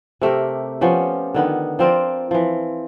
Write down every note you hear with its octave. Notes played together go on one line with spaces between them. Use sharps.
C3 A3 G4 A#4
F3 B3 C#4 G4
D3 D#3 B3
F3 C4 A#4 D5
E3 F3